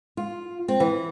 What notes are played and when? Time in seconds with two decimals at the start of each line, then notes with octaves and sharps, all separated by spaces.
0.17 F4
0.68 C4
0.80 E3